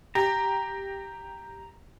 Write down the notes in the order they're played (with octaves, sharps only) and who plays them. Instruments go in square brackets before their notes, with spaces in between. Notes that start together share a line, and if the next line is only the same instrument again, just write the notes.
[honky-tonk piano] G4 [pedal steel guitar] A#5